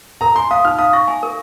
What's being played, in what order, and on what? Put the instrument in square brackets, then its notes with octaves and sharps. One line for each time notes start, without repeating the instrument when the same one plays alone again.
[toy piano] A#4 [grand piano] A#5
[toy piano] G#5 [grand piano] C6
[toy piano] F5 [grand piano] D#6
[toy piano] D#4 [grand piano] F6
[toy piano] F5 [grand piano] D#6
[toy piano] C#6 [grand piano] A#6
[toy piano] G#5
A#4